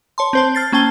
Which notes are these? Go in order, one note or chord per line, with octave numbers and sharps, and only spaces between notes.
C#5 A5 C6
C4 C5 A5
F6 A6 C7
A#3 C#4 G5 A5 G7